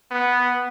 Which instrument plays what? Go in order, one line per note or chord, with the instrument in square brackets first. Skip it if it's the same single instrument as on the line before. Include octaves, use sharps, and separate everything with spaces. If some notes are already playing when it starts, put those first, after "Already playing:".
[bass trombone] B3